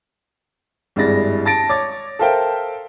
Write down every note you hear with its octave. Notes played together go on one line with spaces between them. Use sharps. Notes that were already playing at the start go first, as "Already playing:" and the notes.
G#1 G2 G#3 E4 A6 A#6
A5 A6 A#6 D7
C#5 D6 A6
A4 A#4 C5 E5 F5 G5